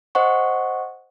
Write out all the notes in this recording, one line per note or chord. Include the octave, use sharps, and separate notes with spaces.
C5 D#5 F#5 C#6